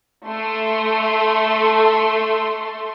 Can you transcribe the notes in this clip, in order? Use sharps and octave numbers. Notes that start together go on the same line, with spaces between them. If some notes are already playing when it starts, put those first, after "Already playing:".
A3 A4 C6